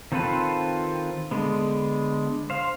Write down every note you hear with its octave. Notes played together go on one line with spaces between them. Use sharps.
D#3 C4 F4 A4 B4
D3 G#3 B3
C5 F5